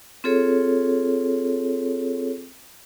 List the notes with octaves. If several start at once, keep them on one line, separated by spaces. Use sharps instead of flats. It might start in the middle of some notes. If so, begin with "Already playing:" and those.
C4 F4 G#4 A4 C#5